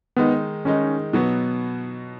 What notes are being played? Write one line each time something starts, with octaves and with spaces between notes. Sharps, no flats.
D#3 G#3 B3 D#4
D#3 G#3 C#4 D#4
B2 F#3 B3